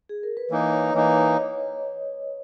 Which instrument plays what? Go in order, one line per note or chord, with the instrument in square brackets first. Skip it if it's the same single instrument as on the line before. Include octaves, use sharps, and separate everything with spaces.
[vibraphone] G#4
A#4
B4
[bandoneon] E3 A#3 D#4 [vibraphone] C#5
[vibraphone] C#5
D#5
[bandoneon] E3 A#3 D#4 [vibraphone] C#5